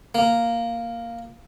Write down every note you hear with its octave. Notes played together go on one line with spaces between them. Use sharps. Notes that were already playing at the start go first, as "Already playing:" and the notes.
A#3